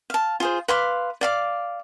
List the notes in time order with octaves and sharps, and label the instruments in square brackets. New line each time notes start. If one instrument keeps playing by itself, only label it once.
[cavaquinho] F5 A5
F4 G#4 C5
B4 F5 C6 D6
D5 F5 D6